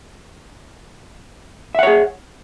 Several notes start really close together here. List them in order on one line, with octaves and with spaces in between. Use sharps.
E5 F#5 C#5 G#4